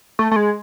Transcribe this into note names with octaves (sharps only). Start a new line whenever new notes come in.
A3
A3
G#3